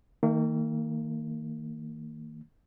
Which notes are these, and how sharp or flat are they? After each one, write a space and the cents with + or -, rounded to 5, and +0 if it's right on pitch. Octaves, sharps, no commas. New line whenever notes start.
D#3 +20 A#3 -35